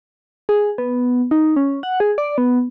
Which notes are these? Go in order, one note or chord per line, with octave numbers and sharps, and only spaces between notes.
G#4
B3
D#4
C#4
F#5
G#4
D5
B3